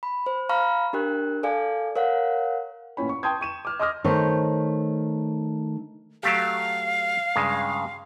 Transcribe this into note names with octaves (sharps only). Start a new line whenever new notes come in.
B5
C5
F5 A#5 B5 C#6 F6
D4 G4 A#4 F#6
A4 D5 F5 G#5
A#4 C#5 F5 F#5
A1 A#2 C#4 B5
C#6
G5 A5 C6 D#6 G6 G#6
C#6 D#7 E7
D6 F6
D#5 C6 D6 D#6 F6 A#6
D#3 A3 C5 C#5
F#3 A3 G4 F5
G2 C#3 G#3